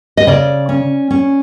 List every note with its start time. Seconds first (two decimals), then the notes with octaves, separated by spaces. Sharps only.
0.17 D#5
0.27 C#3 D5
0.69 C#4
1.11 C#4